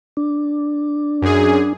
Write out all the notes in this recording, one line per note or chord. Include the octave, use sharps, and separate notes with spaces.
D4
F#2 G#4